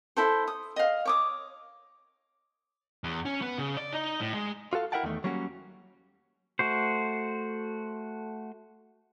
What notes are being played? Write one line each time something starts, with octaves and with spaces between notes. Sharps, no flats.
E4 A4 C5
D#6
D#5 F5
C#5 D6 D#6
E2
C#4
B3
C#3
D5
D#4
A2
G#3
F4 F#4 A4 F5
E4 A#4 E5 F#5 G5 A5
E2 D#3 A3
F#3 G3 A#3 C#4 F#4
A3 F#4 C5